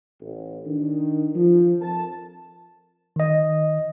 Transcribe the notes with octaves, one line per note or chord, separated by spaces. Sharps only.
A1
D#3 D4
F3
F2 A#4 A5
D#3 D#5